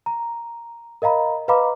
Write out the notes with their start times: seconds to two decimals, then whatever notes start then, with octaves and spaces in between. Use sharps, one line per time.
0.06 A#5
1.02 A#4 D#5 F5 A#5 B5
1.48 B4 D#5 F5 A#5 B5 D6